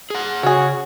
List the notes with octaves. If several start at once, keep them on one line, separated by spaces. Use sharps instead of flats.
G#4 F#5
C#3 F#4 G#4 C#5